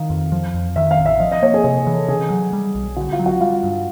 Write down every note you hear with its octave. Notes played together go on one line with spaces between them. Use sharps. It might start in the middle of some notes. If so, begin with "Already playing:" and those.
Already playing: D#3 F5
F2
F3
F2
D#3 E5
F5
A1
E5
F3 D#5
D#5
A#3 C#5
G#4
C3 G#4
E3
A4
C#3 G#4
F#3
G3
B1
D3 F#4
F4
F#3
F#4
G3 F4
G2